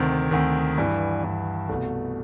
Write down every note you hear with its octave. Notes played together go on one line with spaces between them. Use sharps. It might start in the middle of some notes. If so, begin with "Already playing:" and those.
Already playing: D2 C3 D#3
D2 C3 D#3
G2 E3
G2 E3
C2 B2 A3